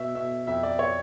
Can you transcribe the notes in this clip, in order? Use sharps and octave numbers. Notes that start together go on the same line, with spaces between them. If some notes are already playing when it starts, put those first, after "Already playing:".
Already playing: B2 E5
B2 E5
F2 E5
D5
C#5